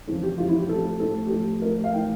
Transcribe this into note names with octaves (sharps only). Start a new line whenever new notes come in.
F2 C#3 E3
G4
F2 C#3 E3 F4
E4
G4
A2 F3 A4
A2 F3 A4
G4
A2 F3 A4
A2 F3 A#4
F5
A2 E3 G5